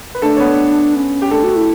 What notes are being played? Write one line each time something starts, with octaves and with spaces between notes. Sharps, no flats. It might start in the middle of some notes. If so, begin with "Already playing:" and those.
B4
A3 D4 A4
C#5
B3 B4
C#4
G4
A3 D4 A4
F#4
E4